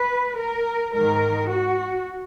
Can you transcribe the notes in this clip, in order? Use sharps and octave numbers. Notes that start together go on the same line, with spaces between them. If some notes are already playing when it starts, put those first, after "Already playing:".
Already playing: B4
A#4
G#2 D#3 A#4
F#4